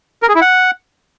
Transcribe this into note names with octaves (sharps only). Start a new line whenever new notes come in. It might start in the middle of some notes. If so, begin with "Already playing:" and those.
A#4
G#4
E4
F#5